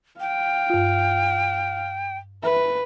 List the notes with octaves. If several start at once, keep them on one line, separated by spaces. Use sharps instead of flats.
F5 G5
G2 F4
B4 E5